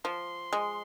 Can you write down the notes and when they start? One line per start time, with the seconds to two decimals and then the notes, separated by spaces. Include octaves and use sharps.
0.04 F3 C6
0.53 G#3